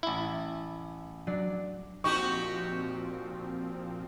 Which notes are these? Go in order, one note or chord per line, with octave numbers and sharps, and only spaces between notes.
A1 E4
F#3 D4 D5
A#2 F3 C4 D#4 F#4 G4 C#6